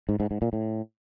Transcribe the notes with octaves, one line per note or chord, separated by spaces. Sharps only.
G#2
G#2
G#2
A#2
A2